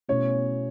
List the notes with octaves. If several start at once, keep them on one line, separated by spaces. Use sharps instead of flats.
B2 A3 C#4 E4 C#5